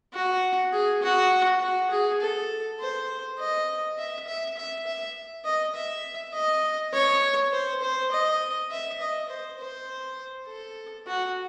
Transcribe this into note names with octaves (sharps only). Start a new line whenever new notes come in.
F#4
G#4
F#4
F#4
G#4
A4
C5
D#5
E5
E5
E5
E5
D#5
E5
D#5
C#5
C5
C5
D#5
E5
D#5
C5
C5
A4
F#4